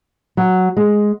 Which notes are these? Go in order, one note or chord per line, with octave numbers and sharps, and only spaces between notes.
F#3
G#3